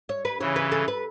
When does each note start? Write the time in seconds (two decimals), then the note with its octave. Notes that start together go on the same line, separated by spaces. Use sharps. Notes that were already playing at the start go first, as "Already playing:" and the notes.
0.09 C#5
0.25 B4
0.40 C#3 E3 C#5
0.56 B4
0.72 A4
0.88 B4